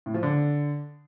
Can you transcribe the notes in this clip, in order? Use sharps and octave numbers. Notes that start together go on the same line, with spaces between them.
A2
F3
D3